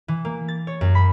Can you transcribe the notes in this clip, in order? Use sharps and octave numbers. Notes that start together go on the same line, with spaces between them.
E3
A#3
A6
C#5
F#2
B5